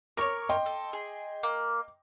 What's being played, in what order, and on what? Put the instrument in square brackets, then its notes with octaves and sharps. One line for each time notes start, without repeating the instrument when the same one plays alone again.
[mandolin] A#4 C#5 [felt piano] C#6 D6
[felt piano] D#5 G5 C6
[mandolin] A4
G#4
A#3